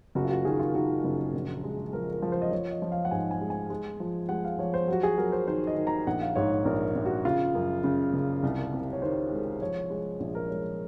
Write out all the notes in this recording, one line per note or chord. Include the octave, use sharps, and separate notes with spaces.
F#1 F#4
F4
F#4
D#3 G#4
F4
D#3 F#4
F#1
A#1
G#3
F3 A#4
A#4
F3
C5
D#5
F3 C#5
D#5
F3
F5
F#5
G#2 G#5
G#5
G#3
G#5
G#3
F3
G#3 F#5
F5
F3 C#5
C5
F#3 F#4
G#4
F#3 A#4
C5
D#3 C5
D#5
D#3
A#5
A#1 F#5
F5
G#2 C#5
A#1 A#4
A#1
F#4
C#3 F4
F#2
C#3
F#1
C2
C3
C#5
D#3 C5
G#3
F3 C#5
G#3
A#1
A#4
G#3 C#5